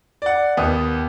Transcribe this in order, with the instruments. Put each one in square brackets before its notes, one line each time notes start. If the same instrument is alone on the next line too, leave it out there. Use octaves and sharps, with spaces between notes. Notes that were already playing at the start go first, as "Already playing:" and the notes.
[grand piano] D5 F#5
D#2 B3 D#6